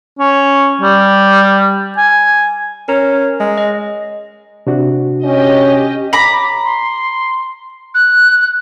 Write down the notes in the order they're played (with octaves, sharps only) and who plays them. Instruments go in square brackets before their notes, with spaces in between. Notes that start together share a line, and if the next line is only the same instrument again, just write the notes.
[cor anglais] C#4
G3
G#5
[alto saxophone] C#4 [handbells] A#4 A#5
[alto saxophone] G#3
[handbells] D#5
[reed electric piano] C3 D4 F#4
[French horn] C#4 [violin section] G4 D#5
[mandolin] A#5 B5 [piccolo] D6
[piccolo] C6
F#6